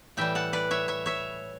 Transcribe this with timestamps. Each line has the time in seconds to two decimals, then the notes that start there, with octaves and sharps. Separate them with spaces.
0.17 A2 E3 G3 E5 G5
0.35 F#5 A5
0.53 B4 D5
0.71 C#5 E5
0.88 C#5 E5
1.06 C#5 E5